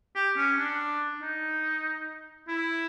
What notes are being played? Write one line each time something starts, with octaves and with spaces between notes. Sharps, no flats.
G4
C#4
D4
D#4
E4